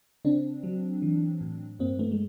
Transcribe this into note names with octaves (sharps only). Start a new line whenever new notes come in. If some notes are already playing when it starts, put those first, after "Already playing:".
C#3 C4 D4
F#3
E3
A2
G2 A#3 C4
A3 B3
G#3